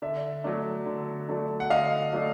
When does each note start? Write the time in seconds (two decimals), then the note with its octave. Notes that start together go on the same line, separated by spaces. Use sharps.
0.02 D3 D5 E5
0.44 F#3 A3 D4
0.86 D3
1.28 F#3 A3 D4
1.60 F#5
1.70 D3 D#5 F5
2.13 F#3 A3 D4